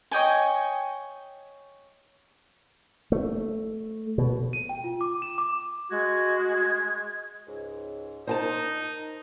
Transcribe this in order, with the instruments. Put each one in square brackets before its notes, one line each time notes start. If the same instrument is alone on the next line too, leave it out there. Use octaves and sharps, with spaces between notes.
[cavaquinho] C#5 D#5 G5 G#5
[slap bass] A3
B2
[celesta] D#7
G5
F4
D6
E7
D6
[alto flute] G#3 [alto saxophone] F#4 [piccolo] G#6
[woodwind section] C#2 G#2
[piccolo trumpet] D#4 [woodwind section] A#4 [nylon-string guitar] C5 G#5 A5